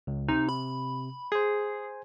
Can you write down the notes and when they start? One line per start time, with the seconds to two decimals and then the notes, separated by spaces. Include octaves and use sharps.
0.07 C#2
0.29 C3 D#4
0.49 B5
1.32 G#4 C5 G#5